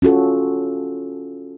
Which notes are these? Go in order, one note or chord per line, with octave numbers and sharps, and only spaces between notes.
C#4 F4 F#4 A4